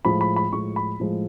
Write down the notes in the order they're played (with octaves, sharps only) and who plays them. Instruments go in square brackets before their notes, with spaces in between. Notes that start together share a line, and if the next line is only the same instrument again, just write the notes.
[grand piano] A2 F3 G#3 B5
B5
B5
A2 F3 G#3 C#6
B5
A2 F3 G#3